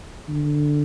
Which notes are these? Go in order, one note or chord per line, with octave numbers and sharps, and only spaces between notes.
D3